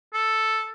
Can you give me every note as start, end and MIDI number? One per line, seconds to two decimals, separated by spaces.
0.14 0.73 69